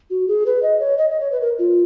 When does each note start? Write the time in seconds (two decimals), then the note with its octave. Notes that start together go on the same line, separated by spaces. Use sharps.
0.10 F#4
0.28 G#4
0.46 B4
0.63 D#5
0.80 C#5
0.98 D#5
1.10 D#5
1.20 C#5
1.32 B4
1.41 A#4
1.59 F4